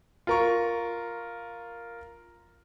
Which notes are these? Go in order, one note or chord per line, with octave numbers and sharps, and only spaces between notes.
F4 A#4 C#6